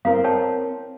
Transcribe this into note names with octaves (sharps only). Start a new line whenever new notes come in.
C4 E4 A#4 C5 F5
C#5 G5 A5